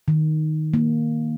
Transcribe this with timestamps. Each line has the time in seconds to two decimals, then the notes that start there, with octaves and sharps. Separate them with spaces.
0.08 D#3
0.74 A#3